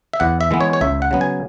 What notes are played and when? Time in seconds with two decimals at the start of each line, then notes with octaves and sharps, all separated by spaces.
0.13 E5
0.20 E2 F#5
0.41 E5
0.51 E3 G#3 B3
0.61 C#5
0.73 C#5
0.81 C#2 E5
1.02 F#5
1.11 C#3 F#3 B3
1.21 G#5